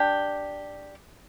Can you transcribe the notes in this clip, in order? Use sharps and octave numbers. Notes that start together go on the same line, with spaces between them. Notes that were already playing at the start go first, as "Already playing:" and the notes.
Already playing: D4 G4